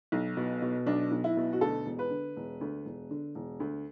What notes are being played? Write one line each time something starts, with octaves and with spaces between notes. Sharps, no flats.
B1
B2
B2
B1 D4
B1
E4
B2
F#4
D2 A4
E1
B4
D3
E1
D2
E1
D3
E1
D2